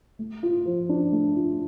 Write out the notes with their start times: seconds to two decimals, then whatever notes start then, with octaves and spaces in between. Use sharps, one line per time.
0.19 A3
0.43 F4
0.66 F3
0.89 D4
1.12 A3
1.35 F4